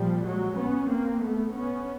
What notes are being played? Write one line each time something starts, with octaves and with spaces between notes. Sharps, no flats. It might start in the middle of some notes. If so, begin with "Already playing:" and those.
Already playing: A#2 F3 G3
F#3 G#3
B3 C#4
A#3 C4
A3 B3
B3 C#4